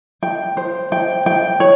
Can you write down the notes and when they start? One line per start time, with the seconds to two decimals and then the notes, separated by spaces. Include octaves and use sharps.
0.23 G5
0.57 C5
0.92 G5
1.26 G5
1.60 C#5